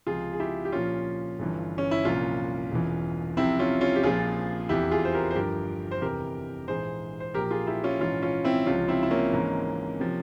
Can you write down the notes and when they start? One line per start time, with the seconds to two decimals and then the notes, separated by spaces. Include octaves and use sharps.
0.07 C#2 C3 F3 F4 G#4
0.33 G#4
0.40 E4 G4
0.65 G4
0.72 A#1 A#2 F3 C#4 F4
1.39 G1 G2 E3
1.78 C#4
1.91 E4
2.05 C2 A#2 F3 C#4 F4
2.71 E1 E2 E3
3.37 C2 C3 F3 C4 E4
3.59 C#4 F4
3.81 C#4 F4
3.96 G4
4.03 A#1 A#2 F3 F4 G#4
4.69 F1 E2 C3 E4 G4
4.91 F4 G#4
5.05 C5
5.14 G4 A#4
5.31 C5
5.35 G1 G2 F3 G4 A#4
5.91 C5
6.02 F1 E2 C3 E3 G4 A#4
6.68 A#1 G#2 E3 G#4 C5
7.20 C5
7.34 A#1 A#2 F3 G4 A#4
7.45 A#4
7.51 F4 G#4
7.67 E4 G4
7.84 C#4 F4
8.00 A#1 G#2 E3 C#4 F4
8.22 C#4 F4
8.44 C4 E4
8.66 C#2 C3 F3 C#4 F4
8.88 C4 E4
9.03 E4
9.10 A#3 C#4
9.32 G#1 G#2 E3
10.00 C3 F3